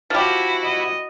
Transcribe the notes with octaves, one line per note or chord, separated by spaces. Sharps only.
F3 E4 F#4 G4
D#5